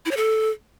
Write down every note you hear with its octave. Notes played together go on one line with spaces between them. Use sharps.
E4
C#5
A4